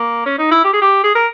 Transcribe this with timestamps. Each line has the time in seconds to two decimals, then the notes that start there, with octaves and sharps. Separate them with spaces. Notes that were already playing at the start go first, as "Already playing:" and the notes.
Already playing: A#3
0.25 C#4
0.38 D#4
0.51 E4
0.64 G4
0.73 G#4
0.81 G4
1.03 G#4
1.15 A#4